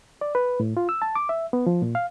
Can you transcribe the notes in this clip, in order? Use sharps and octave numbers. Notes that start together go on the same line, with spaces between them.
D5
B4
A2
F4
E6
A5
D6
E5
B3
F3
A#2
F5